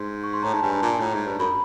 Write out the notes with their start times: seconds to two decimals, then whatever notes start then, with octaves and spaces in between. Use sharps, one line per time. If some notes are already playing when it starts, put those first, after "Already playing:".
Already playing: G#2 C6
0.24 C#6
0.33 C6
0.43 A2 A#5
0.53 G#2 A5
0.62 G2 G#5
0.81 A#2 A5
1.00 A2 A#5
1.14 G#2
1.27 G2
1.39 F#2 B5